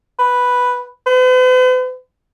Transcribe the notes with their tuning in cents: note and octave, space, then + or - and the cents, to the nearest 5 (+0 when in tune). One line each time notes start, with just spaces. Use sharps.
B4 +0
B4 +45